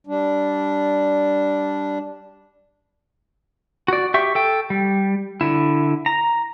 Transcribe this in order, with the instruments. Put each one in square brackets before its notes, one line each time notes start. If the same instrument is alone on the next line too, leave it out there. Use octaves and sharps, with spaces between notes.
[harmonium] G3 D4
[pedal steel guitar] F#4 D5
G4 E5 C#6
A4 G5
G3
D3 E4
A#5